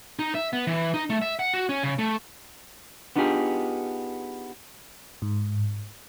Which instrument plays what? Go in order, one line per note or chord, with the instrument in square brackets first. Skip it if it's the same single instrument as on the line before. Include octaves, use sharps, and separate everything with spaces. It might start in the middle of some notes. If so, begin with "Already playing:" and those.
[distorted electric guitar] D#4
E5
B3
E3
D#4
A3
E5
F#5
F#4
C#4
C#3
A3
[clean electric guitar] B3 D4 D#4 F4 G4 G#4
[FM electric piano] G#2